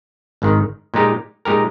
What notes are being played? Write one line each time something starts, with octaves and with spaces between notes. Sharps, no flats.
G#1 G#2 D#3
A#2 G#3 D#4 G4 A#4
A#2 G#3 D#4 G4 A#4